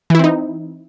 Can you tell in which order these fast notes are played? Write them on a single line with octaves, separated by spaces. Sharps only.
E3 E4 C4 D#4